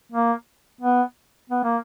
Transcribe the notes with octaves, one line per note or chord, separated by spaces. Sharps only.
A#3
B3
B3
A#3